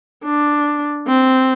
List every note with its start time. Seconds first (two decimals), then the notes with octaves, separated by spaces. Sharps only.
0.25 D4
1.08 C4